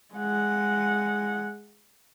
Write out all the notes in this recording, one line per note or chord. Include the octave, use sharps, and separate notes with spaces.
G#3 F#5